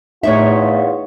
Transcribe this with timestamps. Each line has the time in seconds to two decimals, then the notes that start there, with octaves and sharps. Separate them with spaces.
0.23 E2 A2 D#4 F4 C#5 E5